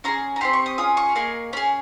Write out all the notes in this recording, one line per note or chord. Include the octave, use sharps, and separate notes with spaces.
C#4 F4 G#4 A#5
A#5
C4 D#4 G4 C6
C#6
D#6
C#4 F4 G#4 D#6
C#6
A#3 D#4 G#4
C#4 G#4